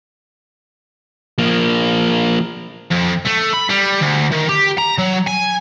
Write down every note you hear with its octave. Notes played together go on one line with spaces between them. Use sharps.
F3 A#3
F2
A3
B5
G3
D2
D#3
G4
A#5
F#3
G#5